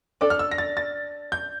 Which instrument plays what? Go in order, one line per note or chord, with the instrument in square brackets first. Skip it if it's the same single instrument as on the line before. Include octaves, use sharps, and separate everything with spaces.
[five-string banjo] D4 A4 D5 [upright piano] D6
[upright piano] F6
E6
A#6
A6
A6
G6